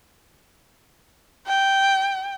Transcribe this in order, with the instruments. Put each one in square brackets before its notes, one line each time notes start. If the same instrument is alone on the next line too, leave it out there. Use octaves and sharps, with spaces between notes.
[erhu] G5